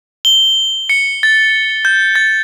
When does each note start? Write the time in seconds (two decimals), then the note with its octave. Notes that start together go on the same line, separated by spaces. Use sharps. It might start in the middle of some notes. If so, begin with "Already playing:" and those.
0.25 G7
0.90 C#7
1.23 A6
1.85 G6
2.15 A6